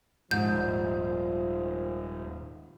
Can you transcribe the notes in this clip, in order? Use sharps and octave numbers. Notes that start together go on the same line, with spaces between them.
D#1 G#2 F3 G6